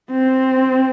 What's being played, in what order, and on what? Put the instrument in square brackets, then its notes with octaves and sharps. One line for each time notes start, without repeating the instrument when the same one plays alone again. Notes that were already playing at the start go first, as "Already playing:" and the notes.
[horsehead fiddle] C4